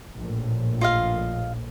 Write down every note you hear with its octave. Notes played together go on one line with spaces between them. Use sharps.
A#1 A2
F4 D#5 F5